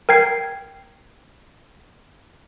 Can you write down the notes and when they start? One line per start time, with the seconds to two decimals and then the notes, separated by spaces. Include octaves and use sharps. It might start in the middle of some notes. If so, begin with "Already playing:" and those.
0.09 A#4 G5 G#6 C7